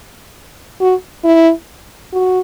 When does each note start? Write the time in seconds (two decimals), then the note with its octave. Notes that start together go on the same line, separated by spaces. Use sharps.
0.80 F#4
1.25 E4
2.13 F#4